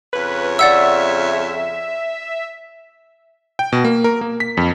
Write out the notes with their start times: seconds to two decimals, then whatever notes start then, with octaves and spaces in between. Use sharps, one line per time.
0.13 F2 C#3 B4 C#5
0.59 D5 E5 F#5 E6
3.59 G5
3.72 B2
3.84 A#3
4.04 A#4
4.21 A#3
4.40 B6
4.57 F2